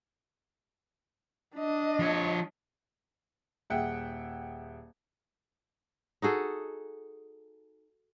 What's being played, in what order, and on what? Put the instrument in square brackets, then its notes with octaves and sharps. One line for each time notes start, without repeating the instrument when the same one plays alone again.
[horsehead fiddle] D4 D#5
[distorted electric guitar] F3 C#5
[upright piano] D#1 G#4 E5 F#5 G5
[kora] D#4 F#4 G#4 A4